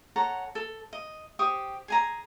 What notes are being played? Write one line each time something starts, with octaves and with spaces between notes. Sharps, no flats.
A4 C#5 F#5 A#5
A4
D#5
G4 C5 C#6 D#6
G#4 G#5 A#5